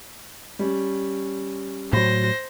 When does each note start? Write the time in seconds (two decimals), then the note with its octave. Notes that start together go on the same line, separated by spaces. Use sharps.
0.59 G3 C#4
1.93 A2 F#3 C5 A#6